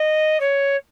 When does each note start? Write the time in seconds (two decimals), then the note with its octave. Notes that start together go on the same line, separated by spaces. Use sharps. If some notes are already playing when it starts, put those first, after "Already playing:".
Already playing: D#5
0.40 C#5